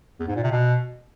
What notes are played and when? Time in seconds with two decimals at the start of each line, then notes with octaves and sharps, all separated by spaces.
0.20 E2
0.28 G#2
0.35 A#2
0.43 C3
0.51 B2